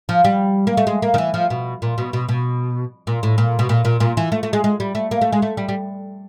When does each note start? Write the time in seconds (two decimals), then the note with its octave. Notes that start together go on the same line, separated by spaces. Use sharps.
0.09 F3
0.24 G3
0.67 A#3
0.77 A3
0.87 G#3
1.02 A#3
1.14 D#3
1.18 E3
1.34 F3
1.50 B2
1.82 A#2
1.98 B2
2.13 B2
2.29 B2
3.07 A#2
3.23 A2
3.38 A#2
3.59 B2
3.69 A#2
3.85 A#2
4.00 A#2
4.17 E3
4.32 A3
4.43 A3
4.53 G#3
4.64 G#3
4.80 G3
4.95 A3
5.11 A#3
5.21 A3
5.32 G#3
5.42 A3
5.57 G3
5.69 G3